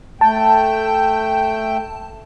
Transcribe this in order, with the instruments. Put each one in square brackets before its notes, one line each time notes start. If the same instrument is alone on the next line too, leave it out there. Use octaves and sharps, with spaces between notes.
[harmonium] A3 G5 [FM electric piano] A5